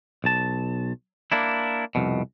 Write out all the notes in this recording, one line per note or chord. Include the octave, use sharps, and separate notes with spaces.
B1 A5
A#3 D4 E4
C2 F2 B2